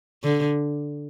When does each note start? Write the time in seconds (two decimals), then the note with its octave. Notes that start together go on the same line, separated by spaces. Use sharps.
0.23 D3